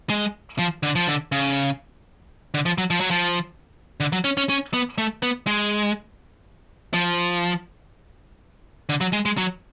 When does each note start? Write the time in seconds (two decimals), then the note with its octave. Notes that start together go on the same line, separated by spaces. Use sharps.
0.10 G#3
0.59 F3
0.83 D3
0.95 F3
1.08 D3
1.32 C#3
2.54 D3
2.66 F3
2.78 F#3
2.90 F3
3.00 F#3
3.11 F3
4.00 D3
4.12 F#3
4.24 C#4
4.37 C#4
4.49 C#4
4.73 B3
4.98 A3
5.23 B3
5.47 G#3
6.94 F3
8.89 D3
9.01 F#3
9.13 G#3
9.26 G#3
9.38 F#3